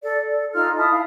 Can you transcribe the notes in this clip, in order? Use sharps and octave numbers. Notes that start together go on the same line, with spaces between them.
A4 D5
A4
D#4 F4 A4 F6
E4 A5 D#6
F5